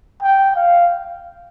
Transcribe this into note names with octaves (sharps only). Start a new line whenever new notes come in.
G5
F5